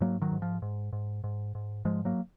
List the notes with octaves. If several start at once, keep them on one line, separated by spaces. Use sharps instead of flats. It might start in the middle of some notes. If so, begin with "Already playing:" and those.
G#2 F#3 A#3
D#3 F#3
G#2
F3
G#2
G#2
G#2
G#2
G#2 F3 G#3
F#3 A#3